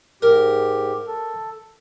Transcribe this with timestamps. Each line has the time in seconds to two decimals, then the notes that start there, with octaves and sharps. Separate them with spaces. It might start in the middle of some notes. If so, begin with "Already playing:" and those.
0.22 G#2 G4 A#4
1.07 A4